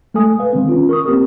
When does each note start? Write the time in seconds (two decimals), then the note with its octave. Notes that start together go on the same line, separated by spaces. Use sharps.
0.14 G#3 A3 A4 G#5 D#6
0.39 B4 F5
0.53 D#3 G#3 B3 C4
0.69 C#4 F4
0.89 A#4 C#6 D#6
1.06 A#3 C4 G4 A#4